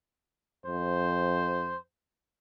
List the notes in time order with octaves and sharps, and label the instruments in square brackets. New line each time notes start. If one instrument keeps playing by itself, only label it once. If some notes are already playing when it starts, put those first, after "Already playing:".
[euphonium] F2 [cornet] C5